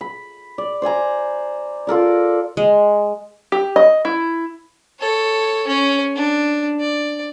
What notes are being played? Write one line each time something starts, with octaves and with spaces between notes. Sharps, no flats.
B5
D5
C5 D5 G#5 A#5
F4 A4 A#4 D5
G#3
G4
D#5
E4
A4 C#5
C#4 C#5
D4
D5